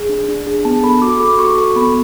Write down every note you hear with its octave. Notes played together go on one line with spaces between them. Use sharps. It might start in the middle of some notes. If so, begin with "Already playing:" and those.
Already playing: G#4
D4
D4
G#4
B3 A5
A4 B5
F#4 D6
A4 D6
F#4 C#6
A4
B3 B5